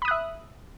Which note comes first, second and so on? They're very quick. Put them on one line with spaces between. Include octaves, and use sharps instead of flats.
B5 D#6 F#6 E5